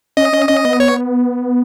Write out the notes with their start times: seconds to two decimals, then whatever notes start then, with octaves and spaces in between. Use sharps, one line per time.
0.17 C#4 D#5
0.33 C#4
0.48 C#4 D#5
0.65 B3
0.80 C#5